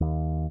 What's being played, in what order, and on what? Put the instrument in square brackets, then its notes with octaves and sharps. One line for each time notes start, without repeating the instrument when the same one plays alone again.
[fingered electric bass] D#2